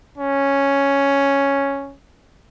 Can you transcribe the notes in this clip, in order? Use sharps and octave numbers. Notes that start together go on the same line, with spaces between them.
C#4